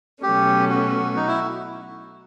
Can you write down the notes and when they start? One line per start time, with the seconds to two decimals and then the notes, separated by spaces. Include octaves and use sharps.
0.23 B2 F#3 A3 C#4 G4
0.69 F#4
1.16 D#4
1.28 E4